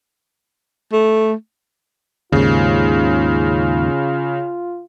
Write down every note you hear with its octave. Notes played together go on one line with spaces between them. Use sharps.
A3
D#2 G#2 C#3 F4